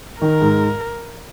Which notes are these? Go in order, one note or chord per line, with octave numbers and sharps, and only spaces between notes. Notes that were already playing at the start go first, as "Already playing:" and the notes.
D#3 A#4
G#2